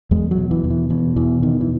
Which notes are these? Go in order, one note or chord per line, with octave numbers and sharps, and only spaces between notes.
E2 G#3
F#3
B2
E3
E2
E3
B2 E3
E2 E3
B2 D#3
E3